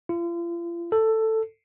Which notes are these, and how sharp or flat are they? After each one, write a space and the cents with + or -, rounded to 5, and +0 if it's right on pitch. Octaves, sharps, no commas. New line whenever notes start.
F4 -40
A4 +10